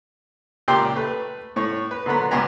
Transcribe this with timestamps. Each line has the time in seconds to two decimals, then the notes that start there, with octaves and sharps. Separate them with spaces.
0.68 C#2 A#2 G4 G5 C6
0.96 A3 B4
1.56 A2 C#5
1.91 B4
2.06 A#2 D3 F#3 B3 B5
2.31 C#2 G2 B3 G#5 A#5